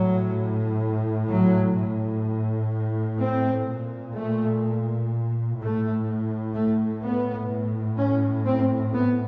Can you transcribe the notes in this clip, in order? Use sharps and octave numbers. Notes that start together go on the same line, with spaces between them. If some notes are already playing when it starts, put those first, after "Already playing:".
Already playing: A2 F#3
F#3
A2
C4
A#2
A3
A2 A3
A3
B3
A2
C#4
C4
B3